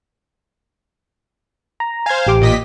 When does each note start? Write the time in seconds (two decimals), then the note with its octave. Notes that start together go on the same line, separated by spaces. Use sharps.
1.80 A#5
2.06 C5 F5 G#5 G#6
2.27 A1 G4 D6
2.41 A#2 D#5 B6